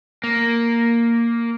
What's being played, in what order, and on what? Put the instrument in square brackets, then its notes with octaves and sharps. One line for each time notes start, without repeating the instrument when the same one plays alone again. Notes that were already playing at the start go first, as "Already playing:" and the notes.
[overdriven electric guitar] A#3